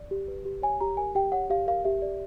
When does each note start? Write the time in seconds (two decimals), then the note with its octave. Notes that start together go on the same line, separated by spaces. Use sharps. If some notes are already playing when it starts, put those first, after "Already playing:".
Already playing: D5
0.11 G4
0.28 B4
0.45 G4
0.62 C#5 G#5
0.80 G4 A#5
0.97 A#4 G#5
1.15 G4 G5
1.32 C#5 F#5
1.50 G4 F5
1.67 A#4 F5
1.84 G4 E5
2.02 D5